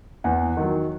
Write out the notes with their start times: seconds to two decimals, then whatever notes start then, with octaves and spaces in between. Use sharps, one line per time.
0.24 E2 F#5
0.57 D#3 F#3